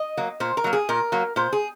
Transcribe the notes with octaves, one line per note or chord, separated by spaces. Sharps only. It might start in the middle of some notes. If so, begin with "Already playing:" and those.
Already playing: D#5
F#3 A#3
A#2 C5
A#4
F#3 A#3
G#4
A#2 A#4
F#3 A#3
A#2 C5
G#4